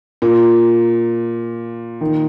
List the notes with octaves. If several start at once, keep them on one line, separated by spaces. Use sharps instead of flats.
A#2
D#3